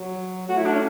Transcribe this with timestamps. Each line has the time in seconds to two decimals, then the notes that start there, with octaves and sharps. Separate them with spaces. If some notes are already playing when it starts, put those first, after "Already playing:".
Already playing: F#3
0.49 A3 F#4
0.57 E4
0.65 D4
0.74 C#4